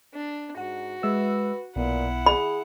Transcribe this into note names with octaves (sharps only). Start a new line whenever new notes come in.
D4
G#2 F#4 F#5
G#3 B4 E5 E6
B1 A#2 B3 E4 F#5
G#4 B5